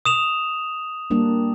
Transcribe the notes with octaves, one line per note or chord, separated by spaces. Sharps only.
D#6 E7 F7
G3 A#3 D4